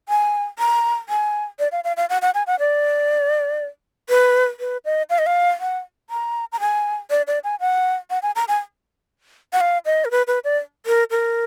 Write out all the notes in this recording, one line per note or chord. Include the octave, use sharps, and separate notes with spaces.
G#5
A#5
G#5
D5
F5
F5
F5
F#5
F#5
G#5
F#5
D5
B4
B4
D#5
F5
D#5
F5
F#5
A#5
A#5
G#5
D5
D5
G#5
F#5
F#5
G#5
A#5
G#5
F#5
F5
D#5
A#4
B4
B4
D5
A#4
A#4